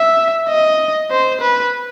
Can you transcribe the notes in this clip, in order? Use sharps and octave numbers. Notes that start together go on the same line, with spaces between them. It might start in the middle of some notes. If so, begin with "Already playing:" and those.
Already playing: E5
D#5
C5
B4